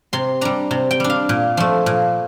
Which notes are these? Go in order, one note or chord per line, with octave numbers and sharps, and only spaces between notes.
C3 C6
G3 D4 A#5
C3
G5
G3 D4
F5
A#2
F3 A3
A#2